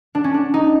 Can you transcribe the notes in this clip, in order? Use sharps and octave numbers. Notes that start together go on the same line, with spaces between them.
D4
C#4
D4
D#4